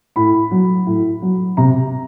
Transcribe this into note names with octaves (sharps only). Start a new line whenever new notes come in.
A2 B5
F#3
A2
F#3
C3 A#5